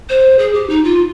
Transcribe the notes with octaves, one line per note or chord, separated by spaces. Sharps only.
C5
G#4
G4
D#4
F4